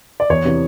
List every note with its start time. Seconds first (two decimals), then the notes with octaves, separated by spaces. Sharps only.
0.20 D5
0.30 E2 C#5
0.45 C3 E3